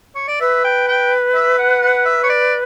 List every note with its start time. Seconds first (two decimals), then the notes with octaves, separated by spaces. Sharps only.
0.15 C#5
0.28 D5
0.40 B4 E5
0.64 G5
0.88 G5
1.34 E5
1.58 F#5
1.81 F#5
2.05 E5
2.23 C#5
2.29 D5